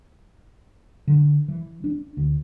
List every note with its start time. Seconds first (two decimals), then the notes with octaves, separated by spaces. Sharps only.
1.07 D3
1.48 E3
1.84 D4
2.17 D2